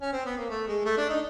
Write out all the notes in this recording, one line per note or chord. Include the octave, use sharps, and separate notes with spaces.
C#4
C4
B3
A#3
A3
G#3
A3
D4
D#4